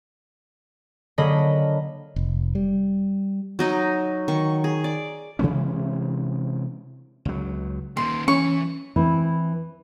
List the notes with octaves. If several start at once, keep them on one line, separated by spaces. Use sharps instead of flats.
D3 F#3 A#3 G#4 D#5 B5
F1
G3
F#3 D#4 D#5
D#3 C#6
G#4
D5
C3 E3 G#3 C#4
C#2 F#3
A#2 D#3 C6
E3 C#4 C#6
E3 C4 E4